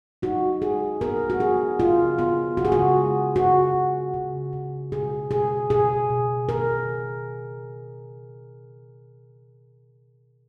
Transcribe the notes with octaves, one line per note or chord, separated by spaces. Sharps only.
D#4 F#4
D#4 G#4
B3 A#4
F#4
B3 G#4
C#3 F4
B3 F4
C#3 F#4
G#4
F#4
G#3
C#3 F#4
C#3
C#3
C#3
B2 G#4
B2 G#4
B2 G#4
B2
D#3 A#4